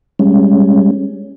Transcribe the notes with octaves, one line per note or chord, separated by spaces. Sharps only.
G3 G#3 C#4